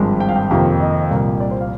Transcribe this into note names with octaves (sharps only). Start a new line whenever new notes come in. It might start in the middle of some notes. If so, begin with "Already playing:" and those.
Already playing: G#1 G2 F3 G#3
G5
F5
G5
F2 C3 D#3 A#3
D#5
C2 A#2 F3 A#3
D5
C5
F5